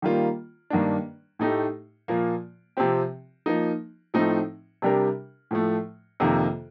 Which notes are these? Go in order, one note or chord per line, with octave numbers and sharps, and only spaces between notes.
D#3 G3 A#3 F4
G2 D#3 A#3 D4
A2 A3 D#4 G4
A#2 F3 A#3
C3 F3 C4 G4
F3 A#3 D#4
A2 F3 A3 C4 D#4
C3 G3 D4 G4 A#4
A2 F3 A3
F2 C3 D#3 A#3